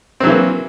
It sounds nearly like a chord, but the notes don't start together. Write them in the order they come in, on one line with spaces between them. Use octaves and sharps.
C4 F#3 E3 A#3